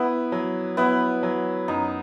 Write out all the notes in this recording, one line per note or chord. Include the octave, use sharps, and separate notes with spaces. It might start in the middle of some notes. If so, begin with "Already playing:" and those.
Already playing: B3 E4
F#3
B3 E4
F#3
F#2 D#4